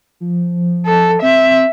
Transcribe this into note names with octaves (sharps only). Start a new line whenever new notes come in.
F3
A4
C4 E5